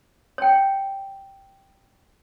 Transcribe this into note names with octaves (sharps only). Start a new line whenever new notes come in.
C#5 G5